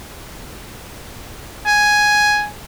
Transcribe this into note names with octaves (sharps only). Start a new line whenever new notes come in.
G#5